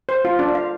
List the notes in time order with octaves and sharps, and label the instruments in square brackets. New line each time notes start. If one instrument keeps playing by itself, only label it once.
[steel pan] C5
F4
D4
F5